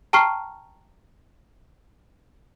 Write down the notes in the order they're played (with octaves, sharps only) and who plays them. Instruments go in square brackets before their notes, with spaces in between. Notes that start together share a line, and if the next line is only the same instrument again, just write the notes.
[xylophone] G5 A5 A#5 C#6 F6 C7